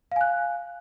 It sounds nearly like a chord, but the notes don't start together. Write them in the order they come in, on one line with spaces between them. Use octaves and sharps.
F5 G#5 F#6